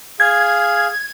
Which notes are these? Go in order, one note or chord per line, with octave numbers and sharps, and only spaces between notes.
G#4 F5 G#6